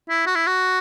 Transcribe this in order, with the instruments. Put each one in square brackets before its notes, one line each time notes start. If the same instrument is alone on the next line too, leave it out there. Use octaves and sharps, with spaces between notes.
[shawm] E4
F#4
E4
F#4